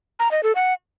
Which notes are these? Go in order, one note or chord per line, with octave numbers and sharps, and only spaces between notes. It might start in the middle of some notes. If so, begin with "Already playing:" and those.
A#5
D#5
A4
F#5